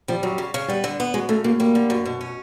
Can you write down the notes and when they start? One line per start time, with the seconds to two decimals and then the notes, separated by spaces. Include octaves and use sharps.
0.08 F3 G3
0.23 F#2 F#3
0.38 C#3
0.54 C#3
0.68 G3 B3
0.84 D3
1.00 B3
1.14 F#2 G#3
1.29 C#3 A3
1.44 F#2 A#3
1.60 G3 A#3
1.75 D3
1.90 F#2
2.06 B2
2.21 C#4